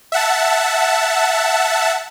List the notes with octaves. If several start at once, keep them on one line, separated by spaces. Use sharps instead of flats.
E5 F#5 A5